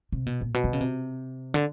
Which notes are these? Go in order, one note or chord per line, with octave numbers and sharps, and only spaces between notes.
C3
B2
A#2
B2
D3
C#3
C3
D3